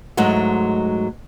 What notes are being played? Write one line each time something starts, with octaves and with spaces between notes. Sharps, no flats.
G#2 F#3 G#3 A3